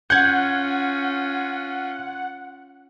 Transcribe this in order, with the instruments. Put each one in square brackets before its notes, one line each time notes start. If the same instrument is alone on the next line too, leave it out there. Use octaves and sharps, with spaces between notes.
[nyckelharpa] C#4 F4 [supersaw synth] F#5 [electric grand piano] G6 G#6